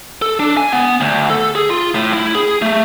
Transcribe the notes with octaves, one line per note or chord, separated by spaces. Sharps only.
A4
D4
G#5
B3
D2
A4
G#4
F4
A2
E4
G#4
A3